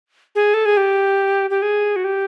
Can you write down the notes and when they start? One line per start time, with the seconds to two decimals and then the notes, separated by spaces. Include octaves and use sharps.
0.35 G#4
0.54 A4
0.65 G#4
0.77 G4
1.50 G4
1.62 G#4
1.96 F#4
2.04 G4